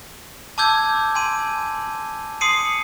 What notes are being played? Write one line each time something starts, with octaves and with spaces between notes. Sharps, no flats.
A5 D6 E6 G6 G#6
G#5 C6 D#7
C6 D#6 C7 C#7 D#7